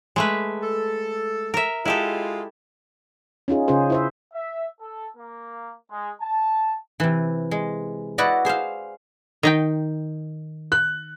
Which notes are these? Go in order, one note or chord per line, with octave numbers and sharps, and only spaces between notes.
G#3 A3 B4
A4
A#4 E5
G#3 E4 F4 G4 A4
C#4 D#4 F4 G#4
C#3 C#4 F4 G#4 C5
E4 C5 E5
E5
A4
A#3
G#3
A5
C3 E3
G#3
E4 F#4 B4 D5 D#5
G#4 C5 E5 F5
D#3 D#4 G5
F#6